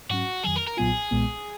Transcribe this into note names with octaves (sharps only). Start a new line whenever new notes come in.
G#2 F#3 C#4 F#4
F2 D#3 F#3 G#4
A#4
A#4
B1 A#2 F#3 B3 F4 G#4
B1 A#2 G#3 B3